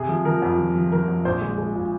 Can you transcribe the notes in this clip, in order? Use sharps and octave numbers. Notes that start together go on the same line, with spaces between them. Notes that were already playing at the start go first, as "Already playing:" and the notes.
Already playing: C3 G#4
F3
F3 A#4
F2
F3
F3
F3 A#4
F2
A#1 C5
G#3
G#3
A#2